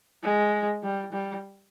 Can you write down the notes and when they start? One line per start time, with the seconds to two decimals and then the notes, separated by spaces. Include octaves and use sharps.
0.23 G#3
0.83 G3
1.12 G3